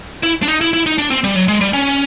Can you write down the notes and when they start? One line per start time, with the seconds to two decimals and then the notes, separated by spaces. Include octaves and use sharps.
0.23 E4
0.43 D4
0.48 D#4
0.61 E4
0.73 E4
0.86 D#4
0.98 D4
1.10 C4
1.24 G3
1.36 F#3
1.48 G#3
1.61 G3
1.73 C#4